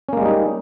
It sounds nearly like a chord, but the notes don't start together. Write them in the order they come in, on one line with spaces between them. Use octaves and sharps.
C#4 A#3 G#3 G3 D#4